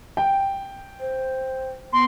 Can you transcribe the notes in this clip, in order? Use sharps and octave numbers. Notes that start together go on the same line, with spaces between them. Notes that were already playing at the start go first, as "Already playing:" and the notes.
G5
C5
B3 C6